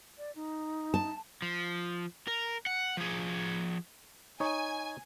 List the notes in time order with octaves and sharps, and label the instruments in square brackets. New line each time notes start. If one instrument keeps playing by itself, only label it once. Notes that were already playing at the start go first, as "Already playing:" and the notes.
[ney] D5
D#4
[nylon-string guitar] A5
[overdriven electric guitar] F3
A#4
F#5
F3 G#4
[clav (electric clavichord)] D#4 C#5 [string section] G#5